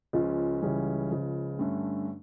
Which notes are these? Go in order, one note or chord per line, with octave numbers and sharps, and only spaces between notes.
C#2 C#3 F3 C#4 F4
C#2 C#3 E3 G3 C#4
C#2 C#3 F3
G2 D3 A3 C#4